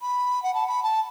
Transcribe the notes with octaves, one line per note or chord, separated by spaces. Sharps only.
B5
F#5
A5
B5
A5